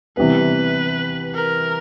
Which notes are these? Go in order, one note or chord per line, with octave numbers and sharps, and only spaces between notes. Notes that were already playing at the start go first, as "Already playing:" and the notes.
C3 E3 G3 B3 B4
A#4